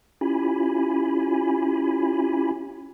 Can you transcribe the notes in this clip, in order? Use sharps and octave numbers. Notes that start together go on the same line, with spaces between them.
C#4 E4 F4 G4 G#5 B5